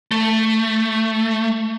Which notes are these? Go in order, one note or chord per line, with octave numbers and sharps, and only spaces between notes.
A3